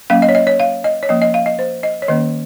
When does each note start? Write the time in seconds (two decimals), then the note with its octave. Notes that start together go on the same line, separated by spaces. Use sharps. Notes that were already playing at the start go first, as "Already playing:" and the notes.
0.10 F#3 A#3 C#4 F5
0.22 D#5
0.29 C#5
0.35 D#5
0.47 C#5
0.60 F5
0.84 D#5
1.03 C#5
1.09 F3 A#3 C#4 D#5
1.22 D#5
1.34 F5
1.46 D#5
1.59 C5
1.83 D#5
2.02 C#5
2.08 D#3 A#3 C#4 D#5